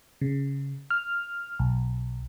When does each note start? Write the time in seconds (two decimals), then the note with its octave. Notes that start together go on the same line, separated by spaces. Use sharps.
0.21 C#3
0.90 F6
1.59 B1